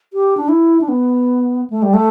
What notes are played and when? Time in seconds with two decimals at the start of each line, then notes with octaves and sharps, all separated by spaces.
0.13 G4
0.37 D4
0.49 E4
0.81 D4
0.89 B3
1.70 A3
1.83 G3
1.94 A3